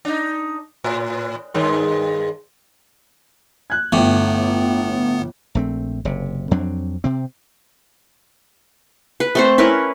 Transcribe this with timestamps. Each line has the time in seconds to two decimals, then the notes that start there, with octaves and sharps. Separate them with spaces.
0.05 D4 D#4
0.84 A2
1.54 G2 D#3 G#3
3.70 F#6 G#6
3.93 G1 A2 B3 G5 D6
5.55 A#1 A3 C4
6.05 F#1 C3
6.51 F2 F#3 C4 D4
7.04 C3 C4
9.20 B4
9.35 A3 C4 C5
9.58 C#4 E4 A#4 B4